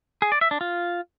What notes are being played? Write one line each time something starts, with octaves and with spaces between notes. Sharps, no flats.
G#4
D5
E5
D4
F4